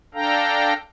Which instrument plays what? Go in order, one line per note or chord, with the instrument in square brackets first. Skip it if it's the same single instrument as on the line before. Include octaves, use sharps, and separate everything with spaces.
[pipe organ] D4 A4 F5 G5 A#5